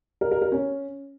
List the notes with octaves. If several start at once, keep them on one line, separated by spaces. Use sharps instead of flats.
A#4
A#4
A#4
C#4